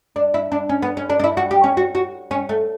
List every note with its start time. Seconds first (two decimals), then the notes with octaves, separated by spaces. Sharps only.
0.16 D4
0.34 E4
0.52 D4
0.69 C#4
0.82 B3
0.97 C#4
1.10 D4
1.20 D4
1.24 E4
1.37 F#4
1.51 G4
1.64 C#4
1.77 F#4
1.95 F#4
2.31 C#4
2.49 A3